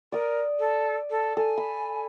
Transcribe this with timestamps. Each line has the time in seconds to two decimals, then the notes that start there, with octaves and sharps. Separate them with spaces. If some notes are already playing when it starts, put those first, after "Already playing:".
0.12 A#4 D5 D#6
0.58 A4
1.10 A4
1.37 A4 G#5
1.58 B5